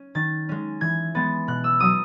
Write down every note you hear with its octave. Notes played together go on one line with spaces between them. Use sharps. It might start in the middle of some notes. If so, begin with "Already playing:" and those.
Already playing: C#4
D#3 A6
G#3 C#4
E3 G#6
G#3 B3 A6
B2 F#6
E6
F#3 C#4 D#6